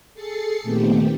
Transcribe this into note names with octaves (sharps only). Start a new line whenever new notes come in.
G#4 A4 A6 C7 C#7
A#2 D#3 A3 B3 C4 G4